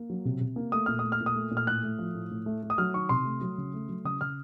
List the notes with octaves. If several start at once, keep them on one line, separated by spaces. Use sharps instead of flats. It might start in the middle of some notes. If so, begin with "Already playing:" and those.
Already playing: A#3
F#3
C3
C3
A#3
A3 D#6
A#2 F6
A3 D#6
F6
A#2
D#6
A3
A#2
F6
A2 F#6
A3
F3
A2
A2
A3
A3
D#6
F#3 F6
D#3 C#6
C3 C6
A3
F#3
C#3
A3
F#3
C#3 D#6
C#3 F6